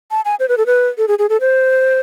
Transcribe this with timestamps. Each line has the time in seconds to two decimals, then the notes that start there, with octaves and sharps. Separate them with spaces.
0.11 A5
0.25 G#5
0.40 C5
0.49 B4
0.58 A4
0.66 B4
0.98 A4
1.08 G#4
1.19 G#4
1.29 A4
1.41 C5